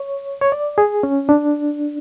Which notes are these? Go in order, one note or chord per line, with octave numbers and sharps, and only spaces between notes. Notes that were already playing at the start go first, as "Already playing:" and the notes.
Already playing: C#5
C#5
D5
G#4
C#4
D4